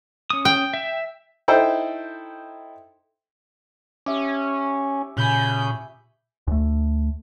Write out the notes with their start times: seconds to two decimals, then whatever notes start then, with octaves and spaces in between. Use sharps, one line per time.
0.30 C#4 D#6
0.45 G5
0.74 E5
1.48 D#4 E4 A4 C5 G5
4.06 C#4 G4 E5 D6
5.17 A#2 C#3 G#5 B5 G6
6.47 D2 A3